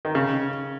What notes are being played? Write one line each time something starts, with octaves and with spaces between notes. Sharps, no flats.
D#3
C#3